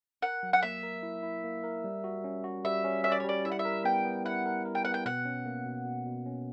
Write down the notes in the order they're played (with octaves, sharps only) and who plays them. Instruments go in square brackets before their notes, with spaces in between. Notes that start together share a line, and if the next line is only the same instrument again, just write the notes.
[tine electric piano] A#4 [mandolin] F#5
[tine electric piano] F#3
[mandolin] F#5
[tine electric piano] A#3 [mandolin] E5
[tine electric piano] A#4
E4
E4
A#3
A#4
G3
F#4
C#4
F#4
[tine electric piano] G3 [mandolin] E5
[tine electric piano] C#4
[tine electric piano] C#4 [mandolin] E5
[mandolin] D5
C#5
[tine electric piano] G3 [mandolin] D5
[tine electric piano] E4 [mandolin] E5
[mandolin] F#5
E5
[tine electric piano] A#4
[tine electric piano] B3 [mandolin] G5
[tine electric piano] B3
[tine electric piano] E4 [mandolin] F#5
[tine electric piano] A#4
A#4
[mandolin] G5
[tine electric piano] B3 [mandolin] F#5
[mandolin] G5
[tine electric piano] B2 [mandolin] F#5
[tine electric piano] C#4
A#3
B2
B2
B2
C#4